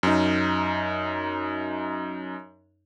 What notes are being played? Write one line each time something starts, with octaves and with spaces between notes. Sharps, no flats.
F#2 D#4